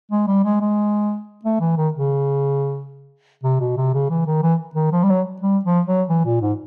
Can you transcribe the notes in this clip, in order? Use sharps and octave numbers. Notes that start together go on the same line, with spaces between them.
G#3
G3
G#3
G#3
A3
E3
D#3
C#3
C3
B2
C3
C#3
E3
D#3
E3
D#3
F3
G3
F#3
G3
F3
F#3
E3
A#2
G#2